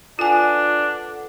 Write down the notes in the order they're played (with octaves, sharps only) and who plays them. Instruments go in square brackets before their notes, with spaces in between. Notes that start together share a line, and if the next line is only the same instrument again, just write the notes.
[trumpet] D4 [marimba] F4 G#5 [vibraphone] A4 B4 F#5